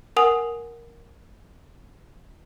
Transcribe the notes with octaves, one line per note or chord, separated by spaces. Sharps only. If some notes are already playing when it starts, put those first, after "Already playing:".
A#4 F#5 G#5 D#6 F7